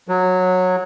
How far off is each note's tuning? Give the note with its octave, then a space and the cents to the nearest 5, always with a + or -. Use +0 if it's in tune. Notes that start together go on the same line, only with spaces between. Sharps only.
F#3 -15